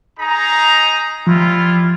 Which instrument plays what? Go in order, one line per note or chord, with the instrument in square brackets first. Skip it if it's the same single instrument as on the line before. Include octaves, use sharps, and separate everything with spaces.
[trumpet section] D#4 G#4 A#5
[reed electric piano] F3 [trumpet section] G3 E4 F4